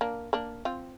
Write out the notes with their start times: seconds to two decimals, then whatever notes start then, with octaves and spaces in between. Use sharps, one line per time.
0.01 A#3 D4
0.33 A#3 D4
0.65 C4 F4